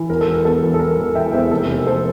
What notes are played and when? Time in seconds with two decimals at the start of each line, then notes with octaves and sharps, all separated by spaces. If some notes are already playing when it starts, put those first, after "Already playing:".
Already playing: E3
0.09 E1 A#4
0.21 A4
0.26 E3
0.33 A#4
0.45 E2 A4
0.63 E2
0.74 A4
0.80 E3 A#4
0.98 E1
1.15 E3 E5 G5
1.33 E2 C5 E5
1.51 F1 A4
1.69 F1 A#4
1.86 F1 A4 C5